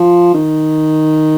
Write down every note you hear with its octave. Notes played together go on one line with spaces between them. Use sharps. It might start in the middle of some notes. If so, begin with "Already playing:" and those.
Already playing: F3
D#3